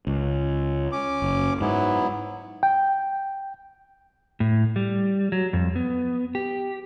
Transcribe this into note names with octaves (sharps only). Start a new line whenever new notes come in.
C#2
C#4 D6
F#1
G#2 F#3 B3 E4
G5
A2
G3
F#3
F2
B3
G4